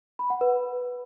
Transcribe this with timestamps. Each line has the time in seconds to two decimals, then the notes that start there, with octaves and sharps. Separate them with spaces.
0.19 B5
0.30 F#5
0.41 B4